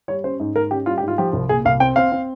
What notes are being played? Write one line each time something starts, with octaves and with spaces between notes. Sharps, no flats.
G3 C#5
C#4 C5
G#2
G#2 A#4
C#4 G4
G3 F4
G4
G#2
F4
F3 G4
C2
A#2 G#4
C2 F5
C4 G5
C4 F5
C4